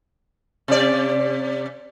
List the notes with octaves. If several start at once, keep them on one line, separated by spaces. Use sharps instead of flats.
C3 D5